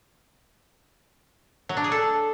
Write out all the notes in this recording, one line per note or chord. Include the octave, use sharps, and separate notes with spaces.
F#3
D4
G#4
A4